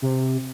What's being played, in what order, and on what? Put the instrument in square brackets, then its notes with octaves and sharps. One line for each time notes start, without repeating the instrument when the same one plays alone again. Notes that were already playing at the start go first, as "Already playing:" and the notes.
[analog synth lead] C3